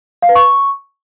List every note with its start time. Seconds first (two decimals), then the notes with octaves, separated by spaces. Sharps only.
0.22 F5
0.29 B4
0.35 C#6